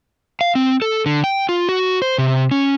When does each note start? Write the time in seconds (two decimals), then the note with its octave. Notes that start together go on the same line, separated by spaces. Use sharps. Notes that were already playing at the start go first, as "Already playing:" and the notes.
0.41 F5
0.55 C4
0.82 A4
1.06 D3
1.24 G5
1.49 F4
1.69 F#4
2.02 C5
2.18 C3
2.51 C#4